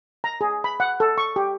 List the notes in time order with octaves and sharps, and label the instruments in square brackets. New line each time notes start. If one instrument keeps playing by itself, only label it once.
[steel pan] A#5
G#4
B5
F#5
A4
C#6
G4